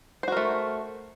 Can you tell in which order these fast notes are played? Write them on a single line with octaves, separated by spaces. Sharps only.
C5 F#4 A#4 A3